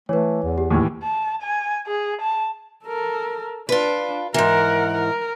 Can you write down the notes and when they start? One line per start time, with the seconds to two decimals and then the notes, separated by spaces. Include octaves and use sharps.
0.09 E3 A3 B4 C#5
0.43 E2
0.58 G4
0.71 D#2 A2 E3
1.03 A5
1.42 G#5
1.87 G#4
2.21 A5
2.85 A4 A#4
3.69 D4 F4 B4
4.34 G#2 E3 A#4 F#5
4.95 A#4